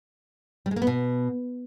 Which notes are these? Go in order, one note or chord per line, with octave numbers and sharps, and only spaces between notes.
G3
G#3
A#3
B3
B2